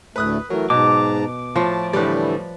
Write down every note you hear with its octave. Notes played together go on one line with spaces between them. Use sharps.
D2 A2 A3 B4 D#6 F#6
E3 F#3 A3 A#4
G#2 B2 A5 A#5 D6
A2 F3 A5
A2 D3 E3 G3 B4 D5